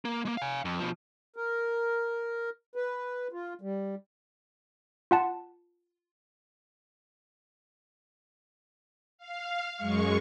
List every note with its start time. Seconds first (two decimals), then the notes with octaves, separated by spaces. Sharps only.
0.05 A#3
0.25 G#3 A#3
0.37 F5 G#5
0.65 F2
0.80 B2 F3
1.36 A#4
2.75 B4
3.32 F4
3.61 G3
5.11 F4 F#5 A5
9.18 F5
9.77 F#2 G#3 C#6